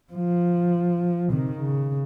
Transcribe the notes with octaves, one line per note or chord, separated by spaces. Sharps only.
F3
C3 D#3
C#3